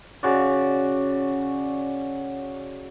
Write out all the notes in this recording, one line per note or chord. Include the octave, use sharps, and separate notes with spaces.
C#3 F#4 D5